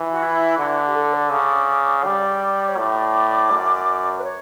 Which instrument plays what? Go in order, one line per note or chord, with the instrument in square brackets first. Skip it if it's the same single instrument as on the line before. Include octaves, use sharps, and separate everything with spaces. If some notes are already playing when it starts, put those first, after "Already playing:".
Already playing: [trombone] E3
[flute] F#4
E4
[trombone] D3 [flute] F#4
[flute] G4
A4
D5
[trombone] C#3
[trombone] G3 [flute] D5
[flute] C#5
[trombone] A2 [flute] D5
[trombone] F#2
[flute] B4
C#5